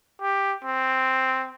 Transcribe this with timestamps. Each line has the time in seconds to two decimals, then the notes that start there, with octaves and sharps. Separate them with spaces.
0.21 G4
0.64 C4